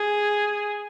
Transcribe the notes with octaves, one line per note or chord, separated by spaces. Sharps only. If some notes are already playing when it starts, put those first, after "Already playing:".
Already playing: G#4